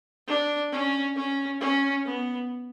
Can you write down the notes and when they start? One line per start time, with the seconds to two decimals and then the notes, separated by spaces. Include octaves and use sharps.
0.28 D4
0.72 C#4
1.16 C#4
1.61 C#4
2.05 B3